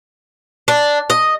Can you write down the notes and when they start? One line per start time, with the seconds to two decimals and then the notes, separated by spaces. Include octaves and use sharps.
0.68 D4
1.10 D#5